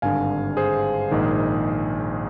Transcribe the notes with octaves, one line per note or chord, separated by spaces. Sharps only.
G#1 G2 D3 F5 G#5
G#4 C5
A#1 G#2 D#3